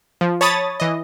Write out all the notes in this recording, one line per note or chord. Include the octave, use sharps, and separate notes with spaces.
F3
C#5 A5 B5 D#6 A6
E3 D#5